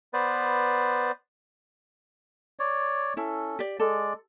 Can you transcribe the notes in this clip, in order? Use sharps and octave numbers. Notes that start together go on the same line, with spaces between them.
B3 B4 C5 D5
C#5 D5
C#4 E4 A4
G4 D5
G#3 A4 D5